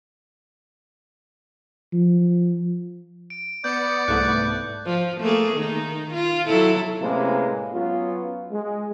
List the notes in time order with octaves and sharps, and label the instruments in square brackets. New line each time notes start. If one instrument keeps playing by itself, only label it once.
[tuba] F3
[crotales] D7
[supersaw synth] B3 C#7 [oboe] D5 [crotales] G6
[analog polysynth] C2 G#2 A3 [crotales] F#6
[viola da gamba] F3
A3 A#3 G#4
D#3 D#4
F4
F#3 E4 A4
[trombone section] A2 C3 G#3 A#3 C#4 B4
F#3 B3 C#4 F4
G#3